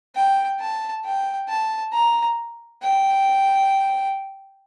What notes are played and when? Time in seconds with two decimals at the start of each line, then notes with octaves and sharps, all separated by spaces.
0.15 G5
0.60 A5
1.04 G5
1.48 A5
1.93 A#5
2.82 G5